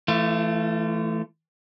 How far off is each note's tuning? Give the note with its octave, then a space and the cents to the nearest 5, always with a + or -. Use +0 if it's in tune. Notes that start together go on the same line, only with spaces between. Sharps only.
E3 +5 A3 +0 F4 -35